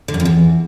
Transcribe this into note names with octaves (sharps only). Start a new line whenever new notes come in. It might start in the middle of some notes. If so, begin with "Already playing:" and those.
D3
F#2
F2
E2